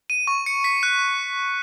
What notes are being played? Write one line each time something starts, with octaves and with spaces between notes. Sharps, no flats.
D#7
C#6
C#7
B6
F#6